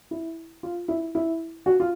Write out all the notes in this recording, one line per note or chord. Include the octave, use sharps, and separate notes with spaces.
E4
F4
E4
E4
F#4
F4